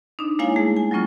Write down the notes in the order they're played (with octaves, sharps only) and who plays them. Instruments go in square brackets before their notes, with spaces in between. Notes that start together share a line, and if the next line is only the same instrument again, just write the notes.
[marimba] D4 D#4
G#3 A#3 E4 C#5 F5 G#5
G#3 A3 G#4
G#5
F#3 G3 A#3 C#4 F4